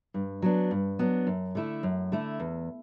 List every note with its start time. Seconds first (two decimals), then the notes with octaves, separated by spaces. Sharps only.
0.14 G2
0.42 F#3 B3 D4
0.71 G2
0.99 F#3 B3 D4
1.27 F#2
1.55 D3 A3 E4
1.83 F#2
2.12 D3 A3 E4
2.40 E2